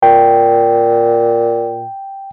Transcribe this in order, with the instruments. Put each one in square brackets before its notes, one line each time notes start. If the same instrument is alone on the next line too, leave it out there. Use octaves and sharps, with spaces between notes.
[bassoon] A#2 [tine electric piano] G5